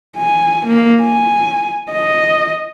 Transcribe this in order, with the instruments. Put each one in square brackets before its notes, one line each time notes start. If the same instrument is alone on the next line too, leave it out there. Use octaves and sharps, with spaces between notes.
[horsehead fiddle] G#5
A#3
G#5
D#5